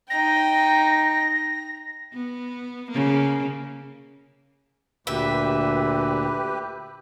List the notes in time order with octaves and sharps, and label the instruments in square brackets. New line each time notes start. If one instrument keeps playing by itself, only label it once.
[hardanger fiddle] D#4 G5 [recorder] A#6
[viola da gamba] B3
C#3 A#3
[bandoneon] D2 A#2 [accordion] G4 B4 [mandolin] E5